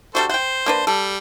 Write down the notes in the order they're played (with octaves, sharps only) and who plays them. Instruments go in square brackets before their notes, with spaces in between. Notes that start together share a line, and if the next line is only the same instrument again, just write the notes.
[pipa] G3 D4 F#4 [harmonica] A4 C5
[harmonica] C5 [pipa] F#5 G5
[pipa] A#3 D4 B4
[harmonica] G3 [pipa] A4